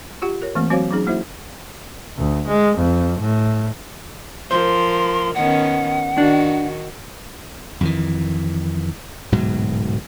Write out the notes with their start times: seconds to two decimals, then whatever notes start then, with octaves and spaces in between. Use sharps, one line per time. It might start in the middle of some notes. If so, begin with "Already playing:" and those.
0.22 F4 G4 F#5
0.42 A#4 C#5
0.55 E3 A3 A#3 C4
0.70 F#3 C4 F#4 C5 C#5 F5
0.91 F#3 C#4 D#4 G#4
1.07 A#3 E4 F#4 C5 E5
2.18 D2
2.48 G#3
2.78 F2
3.20 A2
4.51 F3 A#4 C5 C6
5.35 D#3 B3 C#4 F#5
6.18 D#3 D4 F#4
7.81 F2 D#3 E3
9.32 D1 G#2 B2 F#3